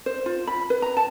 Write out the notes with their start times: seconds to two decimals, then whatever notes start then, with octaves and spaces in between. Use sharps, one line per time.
0.06 C5
0.26 F4
0.47 B5
0.70 B4
0.82 A#5
0.97 A5